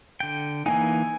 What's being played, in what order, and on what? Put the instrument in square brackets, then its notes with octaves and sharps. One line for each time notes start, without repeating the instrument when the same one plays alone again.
[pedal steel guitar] D3 G5
[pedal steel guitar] E3 A#3 D#4 [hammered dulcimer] G#5